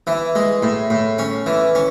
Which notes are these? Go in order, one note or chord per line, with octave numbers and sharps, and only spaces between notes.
E3
G#3
A2
A2
C#4
E3
C#4